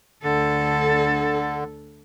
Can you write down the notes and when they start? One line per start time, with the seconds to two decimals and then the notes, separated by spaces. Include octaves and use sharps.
0.23 D2 D3 A4